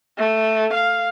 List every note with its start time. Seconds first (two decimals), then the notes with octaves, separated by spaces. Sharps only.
0.18 A3
0.74 F5